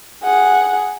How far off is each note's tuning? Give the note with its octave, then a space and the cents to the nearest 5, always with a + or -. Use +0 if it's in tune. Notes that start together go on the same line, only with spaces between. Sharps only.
G#4 +0 F#5 +0